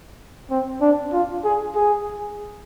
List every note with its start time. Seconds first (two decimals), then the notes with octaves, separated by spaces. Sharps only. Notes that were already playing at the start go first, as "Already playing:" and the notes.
0.50 C4
0.81 D4
1.13 F4
1.44 G#4
1.75 G#4